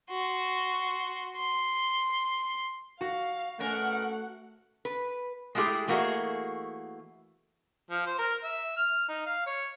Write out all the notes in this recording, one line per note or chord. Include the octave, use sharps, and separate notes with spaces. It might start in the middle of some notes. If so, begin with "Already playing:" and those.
F#4 C6
C6
F#4 F5
B2 A3 C#4 A#4 F#5
B4
G#3 A3 E4 F4 G4 G#4
E3 A3 A#3 F#4 G#4 D#5
F3
C5
A#4
E5
F6
D#4
F5
C#5